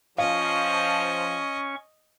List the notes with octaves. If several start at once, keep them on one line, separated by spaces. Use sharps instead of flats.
F3 C#4 D#5 F5 C#6